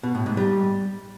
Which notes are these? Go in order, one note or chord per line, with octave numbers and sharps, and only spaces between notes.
B2
A2
G#2
G3